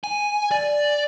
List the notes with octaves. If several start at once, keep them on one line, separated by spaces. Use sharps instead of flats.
G#5
D5